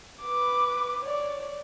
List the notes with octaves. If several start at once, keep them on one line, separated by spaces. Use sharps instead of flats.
B4 D6
C#5 D5